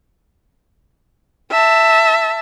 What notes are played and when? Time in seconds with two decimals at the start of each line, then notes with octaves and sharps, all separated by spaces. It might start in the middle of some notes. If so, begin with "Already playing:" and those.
1.51 E5 A5